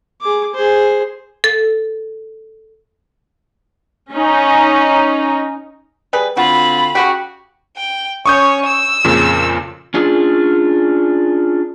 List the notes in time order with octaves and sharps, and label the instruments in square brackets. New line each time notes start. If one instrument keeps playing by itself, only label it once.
[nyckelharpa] G#4 D6
G#4 C5
[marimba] A4
[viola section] C#4 D#4
[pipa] G3 G#4 B4
[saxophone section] D3 C4 F4 [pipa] F#4 [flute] B5
[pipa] C#3 G4 [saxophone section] F#4
[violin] G5
[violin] C#4 C#5 [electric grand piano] C#6 D#6 G6
[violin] E6
[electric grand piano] F2 A#2 C#3
[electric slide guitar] C#4 D4 F4 G#4